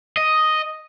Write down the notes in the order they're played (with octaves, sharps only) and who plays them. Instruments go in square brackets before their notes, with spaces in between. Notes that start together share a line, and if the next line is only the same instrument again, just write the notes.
[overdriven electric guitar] D#5